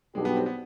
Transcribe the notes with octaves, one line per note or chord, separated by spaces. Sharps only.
B1 B2 G3 G#3 D4 G4
B3
C4
B3